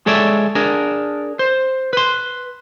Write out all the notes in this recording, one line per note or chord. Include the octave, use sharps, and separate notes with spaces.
G#3 A4 C#5 D5 E5
D4 G#4 A#4
C5
B4 C6